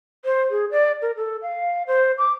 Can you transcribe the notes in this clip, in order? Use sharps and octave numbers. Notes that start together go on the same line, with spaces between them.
C5
G#4
D5
A#4
A4
F5
C5
D6